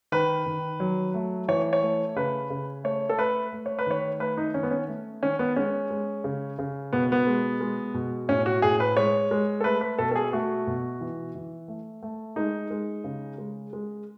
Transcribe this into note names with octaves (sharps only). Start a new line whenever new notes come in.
D#3 B4
D#3
F#3
A3
E3 C#5
C#5
A3
C#3 B4
C#3
A3 C#5
A4
A3 B4
A3
C#5
B4
D#3 C#5
A3 B4
D#4
D#3 C#4
B3
C#4
A3
D#3 C#4
B3
G#3 C#4
G#3
C#3
C#3
B2 B3
B3
G#3
G#3
B2
A2 C#4
F#4
A2 G#4
B4
G#3 C#5
G#3
A4
A3 B4
B4
B2 A4
A4
G#4
A3 F#4
B2
E3
E3
A3
A3
G#3 D#4
G#3
C#3
G#3
G#3